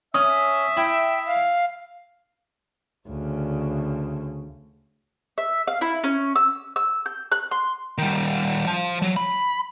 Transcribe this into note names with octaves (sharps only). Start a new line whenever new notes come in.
C#4 E5 D#6
E4 G5
F5
D2 C#3
E5
F5
E4
C#4
E6
E6
G6
F#6
C6
D#3 G3
F3 A5
F#3
B5